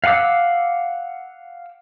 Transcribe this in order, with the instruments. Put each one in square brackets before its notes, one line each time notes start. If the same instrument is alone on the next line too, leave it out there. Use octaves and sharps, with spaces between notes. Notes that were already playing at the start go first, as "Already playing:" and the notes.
[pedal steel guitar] F5 F#5 G#5 D6 E6